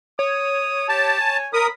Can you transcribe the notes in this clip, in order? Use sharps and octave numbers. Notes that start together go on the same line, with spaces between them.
C#5 D#6
G4 A5
G#5
A#4 B5 D#6